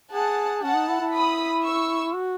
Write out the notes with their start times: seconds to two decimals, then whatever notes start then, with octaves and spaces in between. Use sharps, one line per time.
0.13 G#4 F#5 A5
0.63 C#4 F#5 A5
0.76 D#4
0.88 E4
1.01 E4
1.13 B5 D#6
1.63 C#6 E6
2.14 F#4